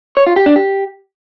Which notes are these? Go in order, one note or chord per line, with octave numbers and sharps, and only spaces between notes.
C#5
F4
G4
D4
G4